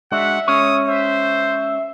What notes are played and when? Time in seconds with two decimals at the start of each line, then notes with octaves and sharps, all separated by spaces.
0.12 G#3 D4 F#4 E5 F#5
0.48 G#3 C#4 C#5 D#6
0.87 C5 E5